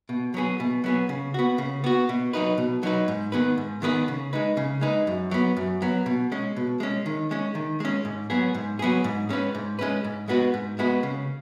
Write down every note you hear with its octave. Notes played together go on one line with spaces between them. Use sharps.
B2
F#3 B3 G#4
B2
F#3 B3 G#4
C#3
B3 F#4
C#3
B3 F#4
B2
F#3 D#4 B4
B2
F#3 D#4 B4
G#2
D#3 B3 G#4 B4
G#2
D#3 B3 G#4 B4
C#3
G#3 D#4 B4
C#3
G#3 D#4 B4
F#2
F#3 B3
F#2
F#3 B3
B2
G#3 C#4
B2
G#3 C#4
D#3
G#3 C#4
D#3
G#3 C#4
G#2
F#3 B3 G#4
G#2
F#3 B3 G#4
G#2
G#3 C#4 B4
G#2
G#3 C#4 B4
G#2
G#3 B3 F#4 B4
G#2
G#3 B3 F#4 B4
C#3